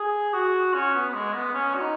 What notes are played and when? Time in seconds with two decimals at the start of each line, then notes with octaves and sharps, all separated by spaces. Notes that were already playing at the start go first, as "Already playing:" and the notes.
Already playing: G#4
0.33 F#4
0.74 C#4
0.94 B3
1.09 B3
1.14 G#3
1.34 B3
1.54 C#4
1.75 F#4
1.81 D#4